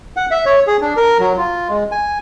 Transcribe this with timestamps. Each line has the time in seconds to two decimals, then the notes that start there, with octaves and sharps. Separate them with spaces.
0.17 F#5
0.31 E5
0.46 C#5
0.67 G#4
0.81 D4
0.96 A#4
1.19 F#3
1.38 F4
1.69 G#3
1.92 G#5